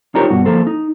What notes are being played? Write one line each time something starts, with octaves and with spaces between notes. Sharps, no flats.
D#4 F4 G4 A#4 C5 C#5
G2 B2 F#4
F3 A#3 A4 C5
D#4